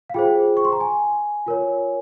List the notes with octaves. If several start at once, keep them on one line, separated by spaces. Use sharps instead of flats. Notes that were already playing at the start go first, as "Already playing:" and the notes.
F5
F4 G#4 C5 G5
C#6
C6
A#5
G#5
F4 A#4 C#5